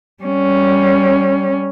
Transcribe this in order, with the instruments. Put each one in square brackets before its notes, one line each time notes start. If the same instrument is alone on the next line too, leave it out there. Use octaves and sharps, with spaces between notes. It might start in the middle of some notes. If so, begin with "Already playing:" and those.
[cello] G3 C#4